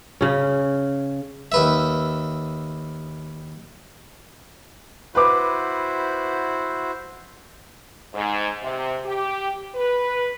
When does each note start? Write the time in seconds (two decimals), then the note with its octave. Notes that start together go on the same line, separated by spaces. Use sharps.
0.21 C#3 C#4
1.52 D#2 B4 E5
5.15 E4 F#4 B4 C5 D6
8.14 G#2
8.63 C3
9.05 G4
9.75 B4